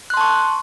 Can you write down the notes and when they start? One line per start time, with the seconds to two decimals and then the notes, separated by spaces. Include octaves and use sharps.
0.10 F#6
0.14 C6
0.17 A5
0.21 C#6